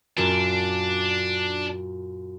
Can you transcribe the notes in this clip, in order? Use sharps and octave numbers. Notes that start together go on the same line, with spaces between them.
F#2 A#2 D4